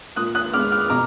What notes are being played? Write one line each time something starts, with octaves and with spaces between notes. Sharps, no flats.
A#2 D#6 F#6
D#6 F#6
G#3 B3 D6 F6
D6 F6
B2 A#5 D6